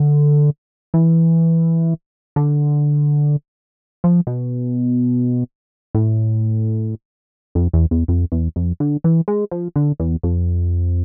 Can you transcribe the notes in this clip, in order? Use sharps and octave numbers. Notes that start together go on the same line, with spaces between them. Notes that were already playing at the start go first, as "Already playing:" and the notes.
Already playing: D3
E3
D3
F3
B2
A2
F2
E2
E2
F2
E2
F2
D3
E3
G#3
F3
D3
E2
F2